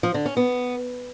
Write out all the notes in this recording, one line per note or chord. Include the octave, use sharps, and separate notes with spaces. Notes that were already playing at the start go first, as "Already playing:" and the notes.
F3
D3
C#4
B3